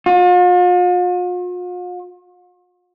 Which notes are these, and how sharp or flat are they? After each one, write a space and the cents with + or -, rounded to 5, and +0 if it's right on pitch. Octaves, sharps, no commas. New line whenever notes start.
F4 +45